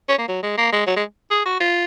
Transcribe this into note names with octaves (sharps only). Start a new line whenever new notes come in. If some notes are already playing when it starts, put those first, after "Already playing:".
C#4
A#3
F#3
G#3
A#3
G#3
F#3
G#3
G#4
F#4
F4